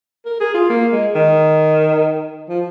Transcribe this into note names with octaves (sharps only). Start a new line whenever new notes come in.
A#4
G#4
F4
A#3
G#3
D#3
F3